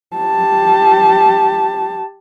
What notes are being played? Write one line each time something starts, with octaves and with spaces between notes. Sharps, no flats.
G4 A5